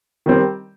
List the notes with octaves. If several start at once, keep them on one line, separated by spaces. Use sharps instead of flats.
D#3 G3 C4